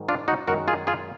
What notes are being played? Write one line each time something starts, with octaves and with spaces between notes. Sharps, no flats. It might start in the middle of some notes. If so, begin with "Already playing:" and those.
Already playing: G#2 D#3 F#3
D4 F4
D#4 F#4
F#2 D#3 G#3 F#4 A#4
F4 G#4
F4 G#4